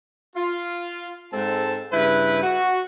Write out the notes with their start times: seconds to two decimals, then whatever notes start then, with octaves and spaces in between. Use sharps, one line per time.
0.36 F4
1.33 G#2 G#3 C4 A4 A5
1.92 G2 C#3 E4 B4
2.43 F#4